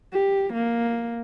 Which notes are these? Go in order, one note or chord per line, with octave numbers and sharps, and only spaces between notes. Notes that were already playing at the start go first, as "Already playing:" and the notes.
G4
A#3